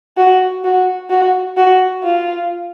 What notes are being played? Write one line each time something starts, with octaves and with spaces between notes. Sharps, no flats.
F#4
F#4
F#4
F#4
F4